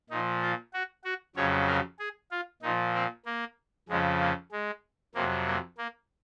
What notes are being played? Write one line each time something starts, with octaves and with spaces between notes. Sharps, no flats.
A#2 F3 D#4
F4
F#4
F#4
F2 C#3 F#3 C#5
A#4
G#4
F4
A#2 F3 D#4
C4
A#3
F2 C#3 F3 G#3
A#3
G#3
F2 C3 F#3 A#3
A#3
A#3